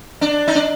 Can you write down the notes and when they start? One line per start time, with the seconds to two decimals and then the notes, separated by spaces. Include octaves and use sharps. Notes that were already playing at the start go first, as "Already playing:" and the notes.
0.21 D4
0.48 D#4
0.55 D4